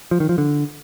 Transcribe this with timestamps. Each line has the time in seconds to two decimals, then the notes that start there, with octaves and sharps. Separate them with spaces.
0.11 F3
0.20 D#3
0.29 F3
0.38 D3